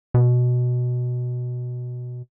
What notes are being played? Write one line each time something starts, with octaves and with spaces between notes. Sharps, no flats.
B2